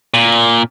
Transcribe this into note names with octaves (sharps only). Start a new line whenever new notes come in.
A#2